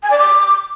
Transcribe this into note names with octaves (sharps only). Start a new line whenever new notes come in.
G#5
D5
D6